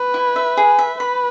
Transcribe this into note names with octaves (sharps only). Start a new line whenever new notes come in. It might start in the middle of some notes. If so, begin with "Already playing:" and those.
Already playing: B4
E4
E5
G#4
E5
B4 B5